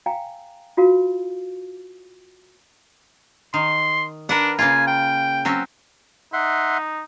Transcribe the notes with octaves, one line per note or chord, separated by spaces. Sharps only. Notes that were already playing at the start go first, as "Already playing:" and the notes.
F5 G5 G#5 A#5
F4 F#4 G#4 A#4 F5
D#3 C6
D4 A#4 B4 F#5
C#3 A#3 F4 G#5
G5
F#3 C4 C#4
D#4 E5 F#5 C6